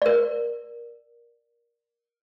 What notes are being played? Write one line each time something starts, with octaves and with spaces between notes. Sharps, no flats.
A#4 D5